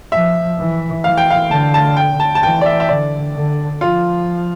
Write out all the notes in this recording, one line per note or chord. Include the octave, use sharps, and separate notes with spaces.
F3 E5
E3
E3 F5
G5
F5
D3 A5
A5
G5
A5
A5
E3 G5
D5
E5
E5
D3 D5
D3
F3 F4